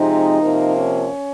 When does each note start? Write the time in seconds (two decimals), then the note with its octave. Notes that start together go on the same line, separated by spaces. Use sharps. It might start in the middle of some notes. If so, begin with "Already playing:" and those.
Already playing: C3 F3 G#3 C4 D#4
0.41 C3 F3 A#3
0.76 C#4